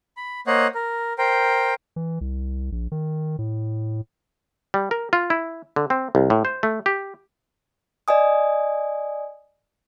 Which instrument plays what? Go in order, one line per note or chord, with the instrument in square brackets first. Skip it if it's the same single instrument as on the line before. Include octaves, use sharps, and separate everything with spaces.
[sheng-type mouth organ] B5
A#3 C5 C#5 D#5 F#5
A#4
A#4 C5 G5
[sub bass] E3
C2
A#1
D#3
A2
[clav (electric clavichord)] G3
A#4
F4
E4
D3
C4
C2
A2
C5
A3
G4
[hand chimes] D5 D#5 G#5 D#6